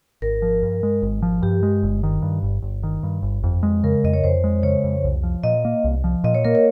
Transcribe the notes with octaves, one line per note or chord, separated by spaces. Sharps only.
G#1 A#4
F3
G2
G#3
G#1
F3
G2 G4
G#3
G1
D#3
G2
G1
G1
D#3
G2
G1
F2
G#3
C#3 A#4
F2 D#5
C#5
F2 C5
G#3
C#3 C#5
F2
C2
F3
A#2 D#5
A#3
C2
F3
A#2 D#5
C#5
A#3 A#4
C#5